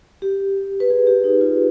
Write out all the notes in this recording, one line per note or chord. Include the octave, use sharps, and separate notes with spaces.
G4
B4
G#4
G4
D#4
F4